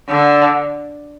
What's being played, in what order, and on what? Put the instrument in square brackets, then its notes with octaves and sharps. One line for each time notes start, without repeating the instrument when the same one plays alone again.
[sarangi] D3